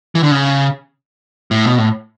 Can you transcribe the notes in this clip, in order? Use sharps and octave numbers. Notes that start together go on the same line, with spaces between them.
E3
D3
C#3
A2
B2
A2